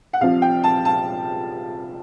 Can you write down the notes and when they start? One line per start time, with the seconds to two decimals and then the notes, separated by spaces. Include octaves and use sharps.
0.13 F#5
0.21 C2 C3 F3 F5
0.42 G5
0.64 A5
0.85 A5